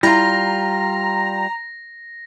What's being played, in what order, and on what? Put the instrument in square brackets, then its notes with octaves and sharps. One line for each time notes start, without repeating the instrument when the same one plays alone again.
[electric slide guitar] G3 F4 [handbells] E4 [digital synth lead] A#5 [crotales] A#6